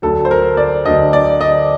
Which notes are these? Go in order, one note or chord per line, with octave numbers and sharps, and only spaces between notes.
D2 D3 F#3 A4
C5
A#4
D5
D2 D3 F#3 D#5
D5
D#5